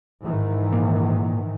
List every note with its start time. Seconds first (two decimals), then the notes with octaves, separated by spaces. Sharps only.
0.22 G#2 D#3 E3
0.72 A#2